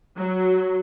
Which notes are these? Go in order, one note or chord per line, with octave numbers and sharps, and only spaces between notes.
F#3